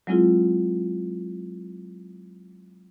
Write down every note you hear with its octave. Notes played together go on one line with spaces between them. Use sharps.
F#3 G#3 C4 E4 F4 G#4